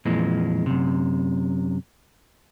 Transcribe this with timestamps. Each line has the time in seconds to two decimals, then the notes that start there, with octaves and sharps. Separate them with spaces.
0.05 F2 A#2 E3 G#3
0.66 F#2 C3